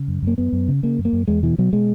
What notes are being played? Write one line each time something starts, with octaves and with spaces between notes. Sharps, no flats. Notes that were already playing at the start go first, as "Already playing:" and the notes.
Already playing: C#3
F#2
F#2 A#3
F#2 B3
F#2
C#3
C#3 A#3
F#2
A#3
F#2
E2 G#3
B2 E3
B2 F#3
B2 G#3